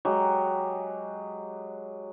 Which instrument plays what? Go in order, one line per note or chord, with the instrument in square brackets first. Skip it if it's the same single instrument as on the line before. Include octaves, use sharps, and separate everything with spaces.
[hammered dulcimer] F#3 G#3 G4